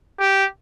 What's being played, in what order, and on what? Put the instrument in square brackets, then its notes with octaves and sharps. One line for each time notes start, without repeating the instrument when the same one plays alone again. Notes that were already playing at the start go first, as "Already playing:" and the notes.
[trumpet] G4